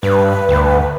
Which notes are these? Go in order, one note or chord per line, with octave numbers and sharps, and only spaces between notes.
G2 B4
D2